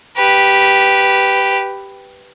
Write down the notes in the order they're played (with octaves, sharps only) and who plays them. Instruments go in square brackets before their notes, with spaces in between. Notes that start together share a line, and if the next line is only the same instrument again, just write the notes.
[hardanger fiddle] G4 B4